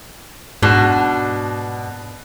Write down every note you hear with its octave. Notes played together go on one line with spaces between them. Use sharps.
G#2 B2 D4